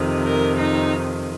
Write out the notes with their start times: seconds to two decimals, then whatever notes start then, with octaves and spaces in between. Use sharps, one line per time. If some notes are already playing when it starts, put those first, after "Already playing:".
Already playing: F2 C3 D#3
0.23 A#4
0.57 D#4